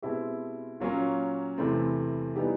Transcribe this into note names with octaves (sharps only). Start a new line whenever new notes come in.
B2 G#3 C4 E4 G4
A#2 F#3 A#3 C#4
E2 C3 E3 A3 C4
E3 G3 B3 D#4 G4